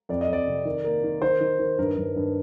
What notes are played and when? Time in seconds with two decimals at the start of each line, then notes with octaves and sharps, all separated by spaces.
0.09 F2 D5
0.21 D#5
0.28 F2
0.33 D5
0.48 C3
0.65 D#3
0.84 A#3
1.04 D#3
1.22 D#3 C5
1.41 D#3
1.59 D#3
1.78 G2 A#4
1.97 G2
2.16 G2